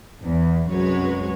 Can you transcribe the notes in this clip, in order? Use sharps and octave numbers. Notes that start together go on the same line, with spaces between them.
E2
C2 F#2 G#3 F#4 B4 C#5